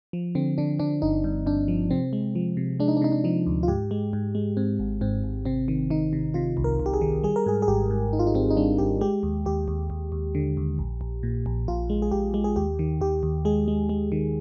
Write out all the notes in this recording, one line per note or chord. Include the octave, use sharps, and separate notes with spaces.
F3
D3 C4
D3 D4
D3 D4
G1 D#4
G2
G2 D4
F3
C3 C4
G#3
F3
C3
G#3 D4
D#4
D4
C3 D#4
D4
F3 D#4
D2
F4
G#2 G4
G#3
G#2
G#3
G#2 C4
G#1
G#2 C4
G#1
C3 C4
D#3
D#3 D#4
C3
C3 F4
C2
A#4
C2
G4
G#4
D#3
G3 G#4
A#4
G#2 G#4
G#4
G#1 G4
G#2
G#1 D#4
F4
D#4
G#1 C4
D#4
G3 D4
G#1 G4
G#3 G4
D#2
D#2 G4
D#2
D#2
D#2
D3
D#2
A#1
A#1
A#2
A#1
A#1 F4
G#3
G#4
A#1 G4
G#3
G#4
D#2 G4
D#3
D#2 G4
D#2
G#3 G#4
G#3
G#3
D#3